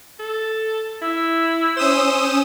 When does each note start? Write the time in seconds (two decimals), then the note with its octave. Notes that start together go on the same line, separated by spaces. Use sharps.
0.20 A4
1.02 E4 E6
1.77 C#4 C5 D#6 E7